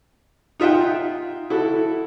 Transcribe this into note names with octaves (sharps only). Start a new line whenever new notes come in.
D#4 F4 E5 F#5 G5
E4 F#4 A4